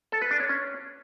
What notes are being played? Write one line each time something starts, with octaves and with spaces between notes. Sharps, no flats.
A4
B4
D4
C#5
C#4